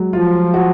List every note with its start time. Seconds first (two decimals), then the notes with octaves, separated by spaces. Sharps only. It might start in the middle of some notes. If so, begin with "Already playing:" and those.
Already playing: F#3 G#3
0.13 F3 F4
0.54 F#4